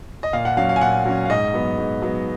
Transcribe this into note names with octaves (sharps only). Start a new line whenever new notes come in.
D#5
A#2 F5
F#5
F#3 C#4 F5
F5
G#5
A#2 F#5
F#3 C#4
F5
G#2 D#5
F#3 B3
G#2
F#3 B3